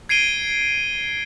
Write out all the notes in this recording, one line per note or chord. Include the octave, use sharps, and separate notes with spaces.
G#6 C7 D7 D#7 G7